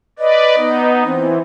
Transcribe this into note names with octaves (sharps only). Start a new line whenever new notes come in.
B4 D5 D#5
B3 D#4
E3 C4